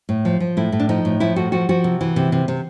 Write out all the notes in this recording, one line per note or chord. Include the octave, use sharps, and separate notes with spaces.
A2
F3
F3
A2 E4
A2
D4
F3 D#4
A2
F3 E4
A2 F#4
F3 F#4
F3 F#4
C3
E3
C3
C3
C3